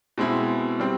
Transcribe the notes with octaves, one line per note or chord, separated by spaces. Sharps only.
B2 G#3 C4 E4
G3 C4